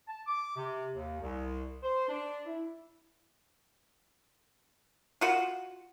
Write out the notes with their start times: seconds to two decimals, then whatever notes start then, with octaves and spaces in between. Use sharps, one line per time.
0.08 A5
0.26 D6
0.56 C3
0.92 D#2
1.21 C2
1.83 C5
2.08 D4
2.46 E4
5.21 F4 F#4